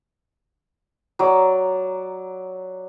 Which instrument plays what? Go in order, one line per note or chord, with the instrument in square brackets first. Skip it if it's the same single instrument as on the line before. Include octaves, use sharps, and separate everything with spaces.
[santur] F#3 D5